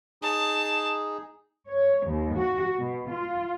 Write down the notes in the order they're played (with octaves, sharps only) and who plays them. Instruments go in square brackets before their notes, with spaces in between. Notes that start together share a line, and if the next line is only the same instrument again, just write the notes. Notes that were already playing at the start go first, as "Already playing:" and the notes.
[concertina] D#4 G#4 [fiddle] A5
[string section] C#5
D#2
F#4
B2
F4